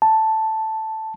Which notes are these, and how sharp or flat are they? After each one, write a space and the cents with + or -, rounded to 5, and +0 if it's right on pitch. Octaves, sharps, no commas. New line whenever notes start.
A5 +0